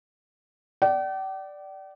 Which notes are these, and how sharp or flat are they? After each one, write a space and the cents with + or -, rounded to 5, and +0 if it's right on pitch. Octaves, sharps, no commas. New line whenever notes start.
D5 +0 G5 -45